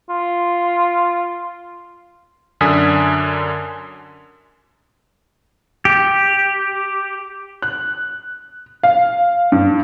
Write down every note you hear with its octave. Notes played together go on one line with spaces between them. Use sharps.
F4
F#2 D3 D4 G#5 D#6 B6
G4
F#6
F5
G2